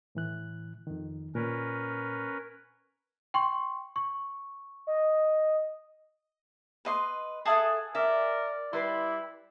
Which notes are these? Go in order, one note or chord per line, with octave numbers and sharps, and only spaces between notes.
A2 E3 F#6
F2 D#3
A#2 C#4 A#4 B4
G5 C6 C#6
C#6
D#5
B4 D#5 C6
G#4 A4 E5 F#5 A5 D#6
A#4 D5 E5
G3 E4 G4 B4 C6